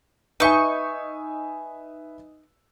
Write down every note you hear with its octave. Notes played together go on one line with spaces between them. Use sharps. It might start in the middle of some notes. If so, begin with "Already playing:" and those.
D#4 B4 E5 G#5 C#6